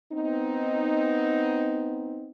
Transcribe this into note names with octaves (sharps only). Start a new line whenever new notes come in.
B3 C4 D#4